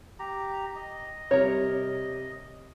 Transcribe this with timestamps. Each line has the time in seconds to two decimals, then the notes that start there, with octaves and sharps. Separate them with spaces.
0.19 G4 A#5
0.76 D#5
1.31 C3 G3 A#4 C#5